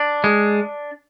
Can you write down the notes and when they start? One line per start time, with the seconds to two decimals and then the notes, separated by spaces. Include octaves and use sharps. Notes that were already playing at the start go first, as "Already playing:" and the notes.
Already playing: D4
0.24 G#3